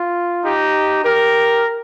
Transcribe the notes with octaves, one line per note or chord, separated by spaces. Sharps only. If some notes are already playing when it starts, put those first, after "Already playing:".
Already playing: F4
D#4 G4
G4 A#4